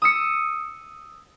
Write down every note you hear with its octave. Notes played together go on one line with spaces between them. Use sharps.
D#6 E6 C#7